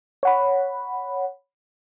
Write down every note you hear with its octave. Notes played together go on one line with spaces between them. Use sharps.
C#5 F#5 B5